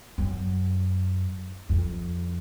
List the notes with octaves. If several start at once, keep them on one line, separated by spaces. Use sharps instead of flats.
F#2
F2